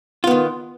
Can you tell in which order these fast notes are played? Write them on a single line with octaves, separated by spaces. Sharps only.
F4 B3 D#3